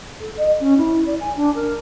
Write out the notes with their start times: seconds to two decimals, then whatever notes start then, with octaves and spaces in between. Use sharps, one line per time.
0.20 A4
0.37 D#5
0.60 C#4
0.77 E4
1.06 D5
1.20 G#5
1.36 D4
1.55 A#4